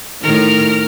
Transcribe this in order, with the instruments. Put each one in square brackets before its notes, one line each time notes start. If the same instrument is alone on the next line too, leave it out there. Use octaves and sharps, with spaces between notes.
[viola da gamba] A2 D#3 [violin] A#4 F6